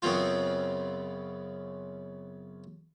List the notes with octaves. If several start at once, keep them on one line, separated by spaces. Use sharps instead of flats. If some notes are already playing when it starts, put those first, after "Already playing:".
F#2 C#3 B3 C4 F4